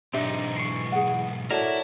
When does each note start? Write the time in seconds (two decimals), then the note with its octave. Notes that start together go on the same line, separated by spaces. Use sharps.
0.13 B1 G#2 C4 D4 D#4 G4 E5
0.56 E3 G#3 C#6 C7
0.92 G#4 F#5
1.51 E4 F#4 A4 A#4 C#5 D5 A5